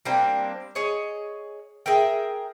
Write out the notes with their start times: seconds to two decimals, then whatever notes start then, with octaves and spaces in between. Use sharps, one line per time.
0.05 G3 A#3 C4 D4
0.75 G#4 C#5 D#5
1.86 G#4 A#4 E5 G5